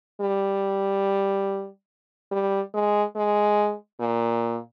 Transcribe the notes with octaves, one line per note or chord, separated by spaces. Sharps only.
G3
G3
G#3
G#3
A#2